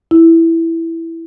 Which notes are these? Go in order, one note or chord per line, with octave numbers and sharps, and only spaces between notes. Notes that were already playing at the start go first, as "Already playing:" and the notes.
E4